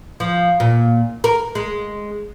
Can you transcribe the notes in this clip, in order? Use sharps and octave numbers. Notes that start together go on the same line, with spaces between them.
F3
A#2
A#4
G#3